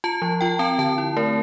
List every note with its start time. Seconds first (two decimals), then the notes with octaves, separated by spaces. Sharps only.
0.04 F4 A5
0.22 F3
0.41 F4 G5
0.59 C4 A5
0.79 D3 A5
0.98 E4
1.17 A3 A#4